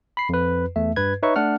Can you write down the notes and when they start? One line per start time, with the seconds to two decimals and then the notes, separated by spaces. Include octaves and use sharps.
0.17 B5 C7
0.29 F2 B4
0.76 E2 A3 E5
0.96 G2 B4 G#6
1.23 D#4 B4 C#5 E5 C#6
1.36 A3 D4 F#5 F6